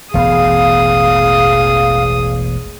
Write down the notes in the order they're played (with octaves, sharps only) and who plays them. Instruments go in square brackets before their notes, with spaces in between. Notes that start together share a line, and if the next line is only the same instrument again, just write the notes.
[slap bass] E1 A1 B3 [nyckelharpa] G#4 D#6 [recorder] F5